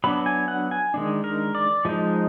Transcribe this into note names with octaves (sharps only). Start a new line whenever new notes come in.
F#3 B3 D4 B5
G#5
F#5
G#5
D#3 G#3 B3 D4
A#4
D5
F3 G#3 D#4